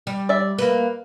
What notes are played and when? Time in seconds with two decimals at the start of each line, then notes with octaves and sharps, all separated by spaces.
0.07 G3
0.29 D5 E5
0.59 A#3 B4